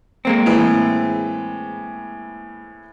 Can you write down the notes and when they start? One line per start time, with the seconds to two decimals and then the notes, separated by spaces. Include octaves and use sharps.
0.25 G#3 A#3 C4
0.46 A2 E3